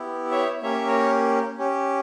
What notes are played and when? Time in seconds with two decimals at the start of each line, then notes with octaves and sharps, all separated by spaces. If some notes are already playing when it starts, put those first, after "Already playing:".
Already playing: B3 E4 G4
0.31 C#5 E5
0.62 A#3 C#4 G4 C#5 E5
0.87 A#4 C#5
1.58 C#4 G4